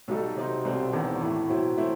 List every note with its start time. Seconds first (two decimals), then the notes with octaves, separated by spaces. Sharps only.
0.08 B1 B2 G3 D#4 A4
0.36 C3 F#3 C4 D#4
0.65 C2 B2 G3 C4
0.93 E1 E2 D#3
1.21 A2 E3 A3
1.50 B2 F#3 C4 E4
1.77 E3 A3 C4 E4